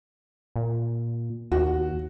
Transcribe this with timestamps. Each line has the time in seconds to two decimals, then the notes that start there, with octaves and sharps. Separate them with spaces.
0.56 A#2
1.52 D#2 F#4